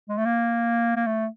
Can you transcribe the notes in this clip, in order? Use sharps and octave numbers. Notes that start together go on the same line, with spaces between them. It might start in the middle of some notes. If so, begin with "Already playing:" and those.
G#3
A3
A#3
A#3
A3